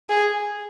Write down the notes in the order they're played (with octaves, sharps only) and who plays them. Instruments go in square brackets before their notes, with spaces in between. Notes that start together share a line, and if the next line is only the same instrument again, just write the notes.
[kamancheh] G#4